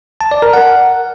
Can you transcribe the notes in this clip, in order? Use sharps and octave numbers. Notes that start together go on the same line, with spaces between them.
A5
D5
A#4
F#5